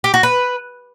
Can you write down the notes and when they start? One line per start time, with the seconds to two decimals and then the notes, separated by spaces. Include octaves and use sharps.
0.04 G4
0.14 F#4
0.23 B4